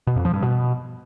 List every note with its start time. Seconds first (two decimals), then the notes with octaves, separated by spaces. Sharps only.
0.07 B2
0.16 F2
0.25 F3
0.34 G2
0.42 B2